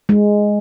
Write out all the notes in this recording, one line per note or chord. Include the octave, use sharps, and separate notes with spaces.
G#3